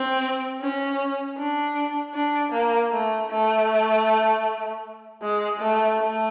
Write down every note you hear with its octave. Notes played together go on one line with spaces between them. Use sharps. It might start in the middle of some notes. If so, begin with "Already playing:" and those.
Already playing: C4
C#4
D4
D4
A#3
A3
A3
G#3
A3
A3